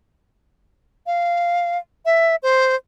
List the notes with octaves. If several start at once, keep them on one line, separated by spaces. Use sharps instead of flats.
F5
E5
C5